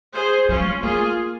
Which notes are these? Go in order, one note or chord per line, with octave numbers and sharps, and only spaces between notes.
G#4 C5
F3 C#4 F4
C4
A#3 F4 G#4